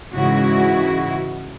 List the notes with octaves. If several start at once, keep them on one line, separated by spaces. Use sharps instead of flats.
G#2 C#3 E3 G#3 E4 F#4